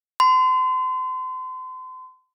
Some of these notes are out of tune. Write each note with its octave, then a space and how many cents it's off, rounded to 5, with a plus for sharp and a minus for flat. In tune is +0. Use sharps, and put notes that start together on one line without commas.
C6 -35